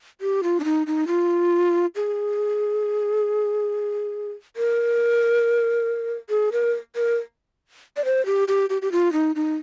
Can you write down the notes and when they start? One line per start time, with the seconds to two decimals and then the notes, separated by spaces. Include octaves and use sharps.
0.21 G4
0.43 F4
0.60 D4
0.64 D#4
0.87 D#4
1.07 F4
1.95 G#4
4.57 A#4
6.30 G#4
6.52 A#4
6.96 A#4
7.97 D5
8.05 C5
8.26 G4
8.48 G4
8.70 G4
8.82 G4
8.92 F4
9.13 D#4
9.36 D#4